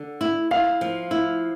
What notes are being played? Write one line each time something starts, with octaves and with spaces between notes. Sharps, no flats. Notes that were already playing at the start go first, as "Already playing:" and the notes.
Already playing: D3
E4
E4 F5
F3
E4